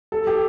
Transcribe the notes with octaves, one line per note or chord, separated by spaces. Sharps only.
A4
G4